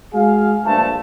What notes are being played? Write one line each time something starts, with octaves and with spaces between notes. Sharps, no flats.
G#3 F#4 G#4 F5
A#1 G2 F3 A3 A5